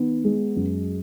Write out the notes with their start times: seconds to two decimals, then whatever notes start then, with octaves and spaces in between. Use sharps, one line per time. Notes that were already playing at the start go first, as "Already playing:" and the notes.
Already playing: D#3 B3
0.24 G#3
0.56 F#2